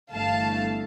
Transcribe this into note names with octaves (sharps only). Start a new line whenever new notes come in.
G1 G2 E3 A3 F5 A5